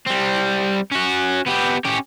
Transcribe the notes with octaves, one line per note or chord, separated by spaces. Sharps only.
G3 C4
C#4 F#4
B3 G4
C#4 G4